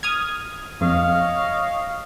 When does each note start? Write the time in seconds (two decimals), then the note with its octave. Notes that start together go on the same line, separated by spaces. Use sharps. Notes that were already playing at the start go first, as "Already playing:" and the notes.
0.03 D#6 F6 G#6
0.81 F2 C#5 D#5 F5